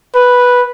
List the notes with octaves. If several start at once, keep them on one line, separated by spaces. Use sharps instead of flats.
B4